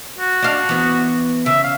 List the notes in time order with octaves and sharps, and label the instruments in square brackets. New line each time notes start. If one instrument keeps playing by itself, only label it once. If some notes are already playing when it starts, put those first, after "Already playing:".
[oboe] F#4
[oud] D4 F5
E3 B3
[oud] C#3 [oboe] E5
[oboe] F5